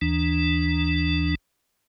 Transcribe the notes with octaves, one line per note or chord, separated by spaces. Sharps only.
D#2 E3 D4